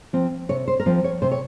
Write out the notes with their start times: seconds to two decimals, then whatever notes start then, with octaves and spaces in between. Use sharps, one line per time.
0.13 F3 C4
0.49 C3 C#5
0.68 C5
0.80 A#4
0.86 F3 C4 C5
1.04 C#5
1.22 C3 C5
1.31 C#5